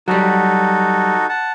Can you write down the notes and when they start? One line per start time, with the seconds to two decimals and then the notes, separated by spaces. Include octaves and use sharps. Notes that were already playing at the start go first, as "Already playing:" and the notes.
0.08 F#3 G3 D#4 F#4 A4
1.29 F#5 A5